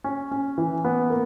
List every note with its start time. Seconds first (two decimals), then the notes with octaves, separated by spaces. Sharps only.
0.04 C#4
0.31 C#4
0.58 E3
0.85 B3
1.10 A#3